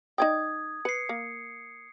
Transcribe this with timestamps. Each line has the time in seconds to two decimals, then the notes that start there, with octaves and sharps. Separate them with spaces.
0.18 D#4 D5 G5 D#6 G#6
0.85 B4 C7 C#7
1.09 A#3